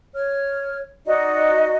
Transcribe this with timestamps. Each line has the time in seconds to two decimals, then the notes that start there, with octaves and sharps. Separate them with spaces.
0.14 C#5 F6
1.06 D#4 F#4 D5 D#5